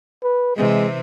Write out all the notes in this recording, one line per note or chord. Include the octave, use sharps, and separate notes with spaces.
B4
C3 E3 G#3 C4